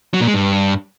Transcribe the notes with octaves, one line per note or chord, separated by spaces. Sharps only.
F#3
A#2
G#3
G2